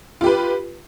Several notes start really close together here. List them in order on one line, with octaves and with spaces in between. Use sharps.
F4 G4 B4